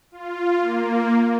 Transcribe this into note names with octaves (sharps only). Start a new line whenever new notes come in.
F4
A#3